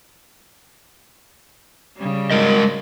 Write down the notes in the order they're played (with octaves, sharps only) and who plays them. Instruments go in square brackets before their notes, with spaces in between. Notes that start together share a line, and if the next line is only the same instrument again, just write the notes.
[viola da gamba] C#3 G3
[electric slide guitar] G#3 A#4 D#5